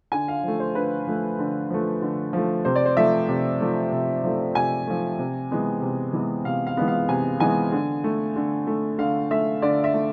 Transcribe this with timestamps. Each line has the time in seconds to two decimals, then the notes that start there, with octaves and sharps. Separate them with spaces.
0.12 D3 G#5
0.28 F5
0.44 F3 A3
0.60 C5
0.75 D3 B4
1.07 F3 A3
1.39 D3
1.70 F3 A3
2.02 D3
2.33 F3 A3
2.65 C3 C5
2.76 D5
2.86 C5
2.97 F3 A3 E5
3.28 C3
3.60 F3 A3
3.92 C3
4.24 F3 A3
4.55 C3 G#5
4.87 F3 A3
5.19 C3
5.51 E3 G#3 B3
5.82 C3
6.13 E3 G#3 B3
6.45 C3 F5
6.67 F5
6.77 E3 G#3 B3
6.88 F5
7.09 C3 G#5
7.40 E3 G#3 B3 G#5
7.72 D3
8.04 A3
8.36 D3
8.67 A3
8.98 D3 F5
9.31 A3 E5
9.62 D3 D5
9.84 E5
9.94 A3